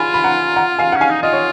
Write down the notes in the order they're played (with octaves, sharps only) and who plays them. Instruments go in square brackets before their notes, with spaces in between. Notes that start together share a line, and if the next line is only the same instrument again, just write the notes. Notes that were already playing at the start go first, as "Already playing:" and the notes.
Already playing: [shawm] F4 [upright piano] G#5 B5
[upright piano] B5
F#5 A#5
F#5 A#5
F5 G#5
F#5
[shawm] C#4 [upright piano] F5 G#5
[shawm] D#4
[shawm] F4 [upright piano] D#5
[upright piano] C#5